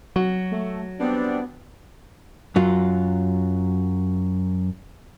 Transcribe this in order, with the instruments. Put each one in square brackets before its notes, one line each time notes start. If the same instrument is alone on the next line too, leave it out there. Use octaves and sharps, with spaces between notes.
[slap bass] F#3 [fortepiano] F#4
[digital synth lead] A3
[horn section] G3 C4 D4 [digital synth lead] B3
[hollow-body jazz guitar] F#2 F#3 F4